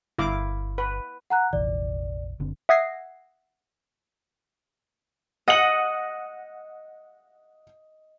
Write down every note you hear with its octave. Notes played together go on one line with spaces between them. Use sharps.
G1 E4 F5 D6
B4
F#5 A#5 F#6
F1 A#1 E3 D5
F#1 D3 C4
E5 F#5 D#6 G#6 A#6 C7
D#5 F#5 C#7 F#7